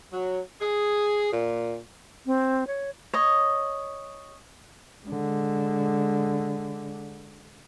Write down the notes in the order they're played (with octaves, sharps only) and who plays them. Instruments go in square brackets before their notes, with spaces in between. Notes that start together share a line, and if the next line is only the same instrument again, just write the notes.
[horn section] F#3
G#4
A#2
[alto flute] C4
C#5
[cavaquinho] C#5 D#5
[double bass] D3 G#3